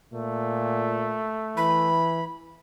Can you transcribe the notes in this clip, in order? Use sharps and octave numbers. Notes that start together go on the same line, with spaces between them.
A#2 A3
E3 B5